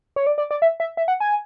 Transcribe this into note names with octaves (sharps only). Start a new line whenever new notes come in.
C#5
D5
D5
D5
E5
E5
E5
F#5
G#5